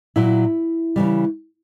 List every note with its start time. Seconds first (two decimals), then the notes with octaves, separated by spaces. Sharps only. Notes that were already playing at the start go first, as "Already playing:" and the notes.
0.16 A#2 F#3 E4
0.96 C#3 E3 G3